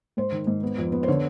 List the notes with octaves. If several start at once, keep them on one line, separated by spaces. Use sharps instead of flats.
G#2 C5
D#3
G#2
B3
F2
B3
C5
D3 C#5